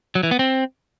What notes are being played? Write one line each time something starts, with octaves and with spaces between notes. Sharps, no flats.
F#3
E3
B3
C4